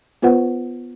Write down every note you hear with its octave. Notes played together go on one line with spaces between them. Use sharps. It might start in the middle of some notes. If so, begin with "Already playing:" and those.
B3 F4 B4 C5 F#5